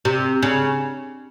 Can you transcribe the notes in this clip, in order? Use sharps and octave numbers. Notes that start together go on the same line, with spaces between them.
C3
C#3